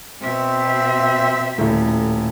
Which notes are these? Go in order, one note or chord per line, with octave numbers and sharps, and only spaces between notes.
B2 C4 E5
D#1 A2